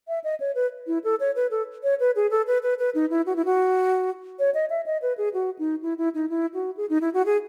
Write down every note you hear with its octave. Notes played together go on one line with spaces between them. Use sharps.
E5
D#5
C#5
B4
E4
A4
C#5
B4
A4
C#5
B4
G#4
A4
B4
B4
B4
D#4
E4
F#4
E4
F#4
C#5
D#5
E5
D#5
B4
G#4
F#4
D#4
E4
E4
D#4
E4
F#4
G#4
D#4
E4
F#4
G#4